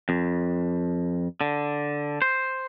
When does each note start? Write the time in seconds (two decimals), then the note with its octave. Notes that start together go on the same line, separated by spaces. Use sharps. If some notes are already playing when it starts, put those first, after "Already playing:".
0.09 F2
1.41 D3
2.22 C5